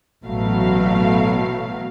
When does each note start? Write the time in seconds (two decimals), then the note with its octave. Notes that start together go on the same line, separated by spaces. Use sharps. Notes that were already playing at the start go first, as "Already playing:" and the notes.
0.24 A1 B2 F#3 A3 F5